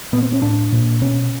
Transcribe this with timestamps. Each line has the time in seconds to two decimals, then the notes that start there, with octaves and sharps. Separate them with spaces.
0.13 A#2 B3
0.23 C4
0.33 C#4
0.42 A2 D4
0.72 A#2
1.02 B2 C#4